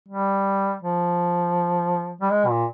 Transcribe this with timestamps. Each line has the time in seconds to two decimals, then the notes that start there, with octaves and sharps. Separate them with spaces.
0.09 G3
0.82 F3
2.21 G3
2.31 G#3
2.48 A#2